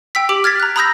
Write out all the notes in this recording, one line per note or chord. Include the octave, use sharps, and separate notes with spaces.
G5 E6 B6
G4 D6 D7 F#7
F6 G#6 A6 B6
A#5 F#6
A#5 B5 D#6 E6 G6 A#6